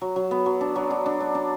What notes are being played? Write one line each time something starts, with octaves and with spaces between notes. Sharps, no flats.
F#3
F#3
B3
F#3
D4
F#3
D4
D4
D4
D4